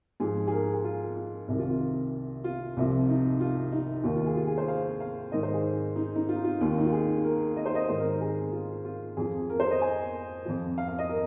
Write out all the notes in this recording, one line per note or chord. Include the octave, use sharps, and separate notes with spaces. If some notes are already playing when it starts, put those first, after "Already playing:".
G#2 F3 G#4
G#4
A#4
G#4
F4
F4
C2 C3 D#3
F4
F4
F4
C2 C3 F3
D#4
F4
D#4
D#2 D#3 F4
F4
G#4
F4
G#4
C5
F5
F5
G#2 D#3 D#5
C5
G#4
D#4
D#4
F4
D#4
F4
D#2 D#3
D#4
F4
G#4
A#4
D#5
C5
D#5
G#2 D#3 C5
A#4
A#4
G#4
F4
F4
F2 F3 G#4
A#4
C5
D#5
G#5
F2 F3
F5
F5
D#5
A#4